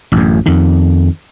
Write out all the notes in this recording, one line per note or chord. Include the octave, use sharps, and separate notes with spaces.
A1 F#2
F2 D#3